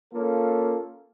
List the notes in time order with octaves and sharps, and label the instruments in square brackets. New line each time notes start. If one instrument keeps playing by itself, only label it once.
[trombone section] A#3 C#4 F4 A4